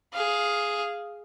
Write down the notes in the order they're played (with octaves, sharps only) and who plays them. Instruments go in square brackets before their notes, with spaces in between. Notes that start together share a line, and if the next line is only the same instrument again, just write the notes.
[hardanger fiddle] G#4 F5